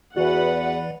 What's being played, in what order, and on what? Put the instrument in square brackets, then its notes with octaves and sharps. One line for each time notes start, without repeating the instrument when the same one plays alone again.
[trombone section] E2 [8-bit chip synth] E3 D5 [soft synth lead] F#4 [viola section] B4 F#5